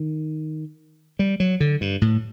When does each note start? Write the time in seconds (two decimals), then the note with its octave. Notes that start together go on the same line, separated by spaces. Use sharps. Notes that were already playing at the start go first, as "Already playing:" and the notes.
Already playing: D#3
1.19 G3
1.40 F#3
1.60 D3
1.81 G2
2.01 A2